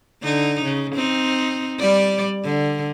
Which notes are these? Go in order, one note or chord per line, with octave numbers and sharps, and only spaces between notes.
D3 D#4
C#3
C4 D#4
G3 D5
D3